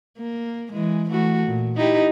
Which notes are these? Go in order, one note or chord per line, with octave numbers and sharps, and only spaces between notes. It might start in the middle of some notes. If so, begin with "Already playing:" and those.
A#3
E3 G#3
E3 A3 F#4
A#2
D#4 E4 G4